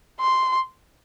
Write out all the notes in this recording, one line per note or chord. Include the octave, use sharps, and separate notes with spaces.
C6